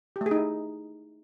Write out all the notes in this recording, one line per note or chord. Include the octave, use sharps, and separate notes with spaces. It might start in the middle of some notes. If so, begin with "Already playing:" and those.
G4
A3
G#4
D#4
E4